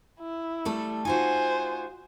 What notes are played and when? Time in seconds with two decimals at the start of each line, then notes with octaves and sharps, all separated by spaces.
0.20 E4
0.65 G3 A3 A4
1.05 D#4 F4 F#4 C5 G#5